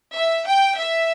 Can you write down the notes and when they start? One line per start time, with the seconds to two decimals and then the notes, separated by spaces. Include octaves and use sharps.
0.15 E5
0.47 G5
0.78 E5